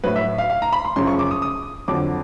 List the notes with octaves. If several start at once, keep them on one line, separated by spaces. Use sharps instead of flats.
A2 F#3 B4
E5
F5
F5
A#5
B5
C6
F#2 C#3 F3 C6
C#6
D6
D#6
D#6
F2 D3 F#3 D6